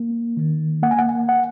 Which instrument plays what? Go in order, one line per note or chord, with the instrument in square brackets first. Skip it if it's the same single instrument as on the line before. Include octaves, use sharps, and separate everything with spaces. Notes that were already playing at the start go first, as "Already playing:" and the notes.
Already playing: [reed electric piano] A#3
D#3
A#3 F#5
G#5
F#5
F#5